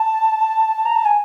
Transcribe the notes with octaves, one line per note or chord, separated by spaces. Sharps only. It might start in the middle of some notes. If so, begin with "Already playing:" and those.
Already playing: A5
A#5
A5
G#5